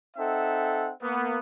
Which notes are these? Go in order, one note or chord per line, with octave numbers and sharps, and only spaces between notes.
C4 D#4 A4 E5 F#5
A#3 B3